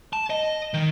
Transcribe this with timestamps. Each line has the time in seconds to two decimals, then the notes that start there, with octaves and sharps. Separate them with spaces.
0.13 A5
0.30 D#5
0.74 D#3